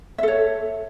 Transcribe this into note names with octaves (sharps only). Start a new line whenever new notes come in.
A4 C#5 E5